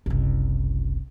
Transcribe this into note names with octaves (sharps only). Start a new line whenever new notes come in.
F#1 C2